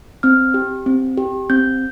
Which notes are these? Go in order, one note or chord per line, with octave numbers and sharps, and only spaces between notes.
C4 F6
G4
C4
G4
C4 G6